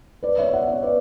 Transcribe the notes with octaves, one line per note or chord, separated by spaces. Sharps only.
B4 D5
C#5 E5
E5
D5 F#5
C#5 E5
B4 D5